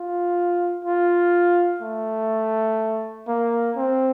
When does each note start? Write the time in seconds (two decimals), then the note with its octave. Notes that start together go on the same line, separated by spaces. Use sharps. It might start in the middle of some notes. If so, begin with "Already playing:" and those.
Already playing: F4
0.85 F4
1.82 A3
3.28 A#3
3.76 C4